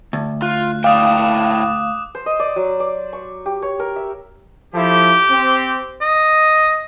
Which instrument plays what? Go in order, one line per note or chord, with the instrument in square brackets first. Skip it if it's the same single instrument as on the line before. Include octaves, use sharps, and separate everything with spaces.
[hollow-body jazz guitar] D2
[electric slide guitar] F4 [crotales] F#6
[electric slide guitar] A2 D5 G5 [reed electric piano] F5 [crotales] D6 D#6 E7
[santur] C5
D#5
D5
F#3
D5
C#6
G4
C#5
A#4
E5
[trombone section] F3 E4 A4 [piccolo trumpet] G4
[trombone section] C4
[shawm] D#5